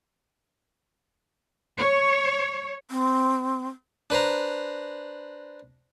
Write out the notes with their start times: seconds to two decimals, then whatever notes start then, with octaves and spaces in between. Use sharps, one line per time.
1.78 C#5
2.89 C4
4.10 D4 B4 C5 A#5